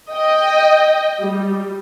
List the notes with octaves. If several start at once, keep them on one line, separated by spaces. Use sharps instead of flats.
D#5 G5
G3